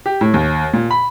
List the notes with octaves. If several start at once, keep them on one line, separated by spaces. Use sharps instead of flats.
G4
A2
D#2
A#2
B5